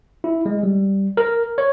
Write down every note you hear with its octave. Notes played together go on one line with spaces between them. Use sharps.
E4
G#3
G3
A#4
C#5